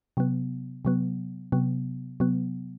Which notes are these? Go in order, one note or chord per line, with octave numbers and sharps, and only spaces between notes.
C3 F#3 B3
C3 F#3 B3
C3 F#3 B3
C3 F#3 B3